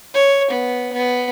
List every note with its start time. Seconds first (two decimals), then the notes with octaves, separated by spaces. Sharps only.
0.14 C#5
0.50 B3
0.92 B3